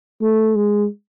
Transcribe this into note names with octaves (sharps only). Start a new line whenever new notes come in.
A3
G#3